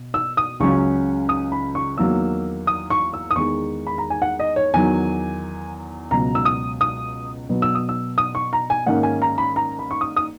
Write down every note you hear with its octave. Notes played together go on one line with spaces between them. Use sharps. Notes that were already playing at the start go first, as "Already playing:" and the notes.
Already playing: B2
E6
D#6
C#2 C#3 F#3 C#4 C#6
D#6
B5
C#6
E2 D#3 F#3 A#3 E6
D#6
C#6
E6
D#6
E2 D#3 G#3 C#6
B5
A#5
G#5
F#5
D#5
C#5
E2 D#3 F#3 G#5
C#2 B2 F#3 A#5
E6
D#6
D#6
B2 F#3 B3
E6
D#6
E6
D#6
C#6
A#5
G#5
G#2 D#3 A#3 C#4 F#5
G#5
A#5
B5
A#5
B5
C#6
D#6
D#6